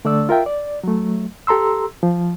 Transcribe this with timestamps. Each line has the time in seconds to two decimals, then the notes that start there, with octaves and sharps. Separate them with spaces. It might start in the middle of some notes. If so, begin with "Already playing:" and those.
0.05 D3 A3 D4 D5 E6
0.29 F4 A#4 E5 G5
0.46 D5
0.84 F#3 A3
1.47 G4 A4 A#5 C6 E6
2.03 F3